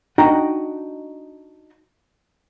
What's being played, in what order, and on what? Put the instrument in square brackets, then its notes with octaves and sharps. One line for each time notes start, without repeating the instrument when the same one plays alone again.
[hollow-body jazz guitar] D4 D#4 F#4 D#5 G5 A#5